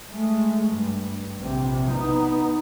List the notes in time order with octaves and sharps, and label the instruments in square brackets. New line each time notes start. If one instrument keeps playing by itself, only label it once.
[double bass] G#3 A3
G2
A#1 C3
B3 D#4